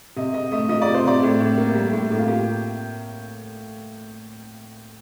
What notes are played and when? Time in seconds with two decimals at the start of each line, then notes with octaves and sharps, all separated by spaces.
0.16 C3 D#5
0.34 C3 D#5
0.52 A3 D#5
0.69 F3 D#5
0.82 D5
0.87 C3
0.94 C5
1.04 C3 D5
1.23 A2
1.40 A2
1.58 A#3
1.75 G3
1.93 A2
2.11 A2
2.18 F4
2.28 A#3 G4